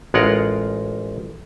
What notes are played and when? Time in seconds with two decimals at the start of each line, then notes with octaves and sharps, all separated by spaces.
0.14 A1 G#3 F4 A#4 F#5